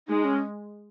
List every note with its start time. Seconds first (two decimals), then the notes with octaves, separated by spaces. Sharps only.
0.08 G#3 D#4
0.25 C#4